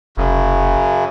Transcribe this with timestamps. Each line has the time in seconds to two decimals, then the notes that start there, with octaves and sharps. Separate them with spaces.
0.17 F1 F#2 C#3